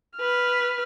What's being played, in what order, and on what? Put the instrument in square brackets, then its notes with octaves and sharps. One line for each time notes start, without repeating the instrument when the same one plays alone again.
[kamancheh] B4 F6